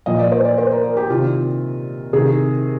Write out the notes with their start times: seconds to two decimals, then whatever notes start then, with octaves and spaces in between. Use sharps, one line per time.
0.06 A#2 F3 D#5
0.19 D5
0.32 C5
0.45 D5
0.58 C5
0.71 A#4
0.84 A#4
0.97 G4
1.10 C3 D#3 F4
2.13 C3 D#3 G#4